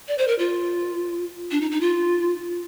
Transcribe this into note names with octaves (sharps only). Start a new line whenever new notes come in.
D5
C5
A#4
F4
D4
D#4
D#4
F4